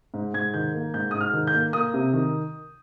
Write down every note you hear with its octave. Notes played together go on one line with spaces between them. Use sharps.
G#2
G#2 G#6
D#3 G6
A#3
G#2 G6
G#2 D#6
F6
D#3
G6
A#3
A#3 D#6
C3
D#3